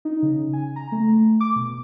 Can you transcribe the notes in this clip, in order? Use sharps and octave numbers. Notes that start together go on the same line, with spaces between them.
D#4
C#3
G#5
A#5
A3
D6
B2